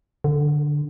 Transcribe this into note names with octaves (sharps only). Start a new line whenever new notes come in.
D3